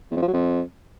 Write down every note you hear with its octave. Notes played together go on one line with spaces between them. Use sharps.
E2
F2
F3
F#3
F2